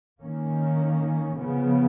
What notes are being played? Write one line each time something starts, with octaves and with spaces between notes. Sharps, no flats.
D#3 A#3 C#4
C#3 F3 B3